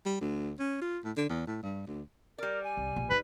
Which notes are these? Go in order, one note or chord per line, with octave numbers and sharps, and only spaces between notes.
G3
D2
C#4
F4
A2
D3
E2
A2
G2
D2
G3 A#4 D5
G#5
C2
A#1
D#4 B4